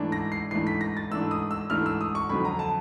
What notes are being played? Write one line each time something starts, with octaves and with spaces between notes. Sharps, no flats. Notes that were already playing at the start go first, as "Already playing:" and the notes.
Already playing: G#2 E3 A3 D4
A#6
C7
G#2 E3 A3 D4 C7
B6
A#6
A6
G#2 E3 A3 D4 E6
D#6
E6
G#2 E3 A3 D4 F6
E6
D#6
C#6
F2 D3 F#3 B5
A#5
A5